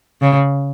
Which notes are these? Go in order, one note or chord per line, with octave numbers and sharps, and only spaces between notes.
C#3